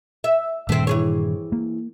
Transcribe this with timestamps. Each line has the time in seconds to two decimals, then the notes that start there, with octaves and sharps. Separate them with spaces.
0.24 E5
0.69 G2 A#2 D#3 A3 C4
0.87 E3 G#4 C#5
1.52 A#3